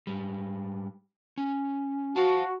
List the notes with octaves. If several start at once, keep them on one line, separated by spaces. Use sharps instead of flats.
G#2 G3
C#4
F#4 C5 F5 A5